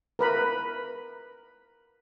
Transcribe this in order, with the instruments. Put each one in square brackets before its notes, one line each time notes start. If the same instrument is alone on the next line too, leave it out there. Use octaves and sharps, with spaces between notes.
[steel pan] A#4 B4 B5